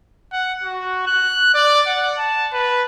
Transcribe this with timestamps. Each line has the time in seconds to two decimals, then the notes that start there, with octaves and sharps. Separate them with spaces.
0.32 F#5
0.63 F#4
1.07 F#6
1.54 D5
1.86 F#5
2.18 A5
2.53 B4